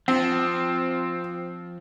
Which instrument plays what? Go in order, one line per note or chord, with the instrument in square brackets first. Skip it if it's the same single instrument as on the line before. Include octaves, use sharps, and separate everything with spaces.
[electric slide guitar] F3 [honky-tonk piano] C4